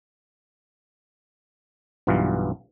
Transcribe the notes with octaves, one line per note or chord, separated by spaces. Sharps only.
B1 G2 E3 F4